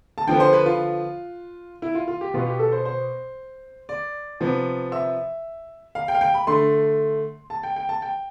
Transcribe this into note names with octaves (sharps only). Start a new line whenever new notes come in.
A5
D3 F3 B3 G5
C5
B4
F4
E4
F4
F4
G4
B2 B3 F4
G4
A4
C5
C5
D5
C3 F3 B3
E5
F5
G5
F5
G5
B5
D3 A3 C6
A5
G5
G5
A5
G5